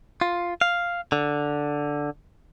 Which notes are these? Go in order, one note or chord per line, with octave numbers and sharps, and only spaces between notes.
F4
F5
D3